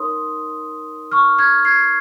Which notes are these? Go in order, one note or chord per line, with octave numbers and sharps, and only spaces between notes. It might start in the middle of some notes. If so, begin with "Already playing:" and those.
Already playing: D#4 A#4 C#5 C6 D#6
C#6 F6
F6 G#6
G#6 C7